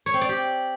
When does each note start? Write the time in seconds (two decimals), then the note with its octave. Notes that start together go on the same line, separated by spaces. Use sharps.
0.06 C#5
0.14 C4
0.21 D5
0.29 G4